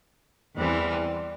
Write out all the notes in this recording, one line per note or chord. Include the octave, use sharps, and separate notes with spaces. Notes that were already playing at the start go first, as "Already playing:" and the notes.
E2 E3 G3 C4